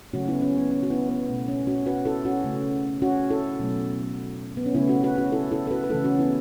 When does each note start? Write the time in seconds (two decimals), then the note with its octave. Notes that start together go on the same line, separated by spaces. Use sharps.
0.13 C#3 F#3 A3 C#4 F#4
0.28 B3 E4
0.42 C#4
0.57 B3
0.71 C#4
0.83 F#4
0.90 B3 E4
1.09 B3
1.28 B2 A3
1.48 C#4
1.67 C#4 F#4
1.86 F#4 B4
2.06 E4 A4
2.25 C#4 F#4
2.44 C#3 A3
3.02 C#4 F#4
3.30 E4 A4
3.60 B2 F#3 A3
4.57 B3
4.66 C#4
4.75 C#3 A3 B3 E4
4.89 C#4 F#4
5.03 F#4 B4
5.18 C#4 F#4
5.32 E4 A4
5.52 E4 A4
5.67 A4
5.71 F#4 B4
5.84 B4
5.90 C#3 E3 A3 E4 A4
6.04 C#4 F#4
6.19 B3 E4